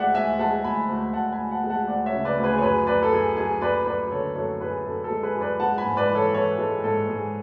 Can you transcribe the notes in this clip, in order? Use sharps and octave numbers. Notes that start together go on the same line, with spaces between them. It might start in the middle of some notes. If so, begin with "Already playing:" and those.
Already playing: D2 G#3 D5 E5 F#5
D2 E5 G#5
G#3 F#5 A5
D2 G#5 B5
D2
D2 F#5 A5
G#5 B5
D2
F#5 A5
G#3
F#5 A5
D2 D5 F#5
C#5 E5
C#3
B4 D5
D2
G#4 B4
C#5
F#2 G#4 B4
F#2 B4 D5
A4
F#2 G#4
F#2 G#4
F#2 B4 D5
F#2 B4 D5
D3 A4 C#5
F#2 A4 C#5
F#2 G#4 B4
F#2 A4
A4
G#3
G#4 B4
F#2
B4 D5
G#3 F#5 A5
G#5 B5
G#2
B4 D5
E3
A4 C#5
E3 A4 C#5
G#3 A4
G#2 A4
G#2 G#4